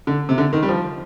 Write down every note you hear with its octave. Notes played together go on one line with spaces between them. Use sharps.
D3
C3
D3
D#3
G3
F3